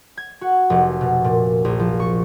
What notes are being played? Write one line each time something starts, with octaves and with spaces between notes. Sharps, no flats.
G#6
F#4
F1
B2
A#2
A#1
F3
C#6